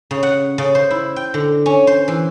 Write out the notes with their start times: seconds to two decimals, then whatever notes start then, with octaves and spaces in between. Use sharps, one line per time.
0.11 C#3
0.23 F#5
0.58 C#3
0.75 C5
0.90 E4
1.16 G5
1.34 D3
1.66 C#4
1.87 C5
2.08 E3